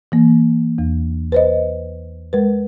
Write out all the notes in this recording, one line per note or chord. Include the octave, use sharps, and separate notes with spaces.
E3 A#3
E2
B4 C5 D#5
G#3 A#4 B4